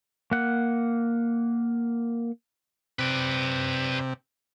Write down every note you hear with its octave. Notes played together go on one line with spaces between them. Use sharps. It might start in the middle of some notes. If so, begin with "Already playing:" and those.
A#3 F#5
C3 B4 D5